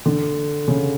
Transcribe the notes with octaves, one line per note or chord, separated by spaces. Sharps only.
D3
C#3